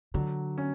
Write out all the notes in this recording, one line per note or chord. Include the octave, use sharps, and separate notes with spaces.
D3 F#3
C#4